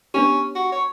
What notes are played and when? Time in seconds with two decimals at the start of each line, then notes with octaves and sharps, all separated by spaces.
0.14 B3 C#4 D4 G4
0.55 F#4
0.72 C#5